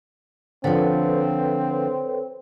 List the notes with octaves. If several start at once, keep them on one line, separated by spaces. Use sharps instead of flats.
D3 F3 C4 A4 B4 C#5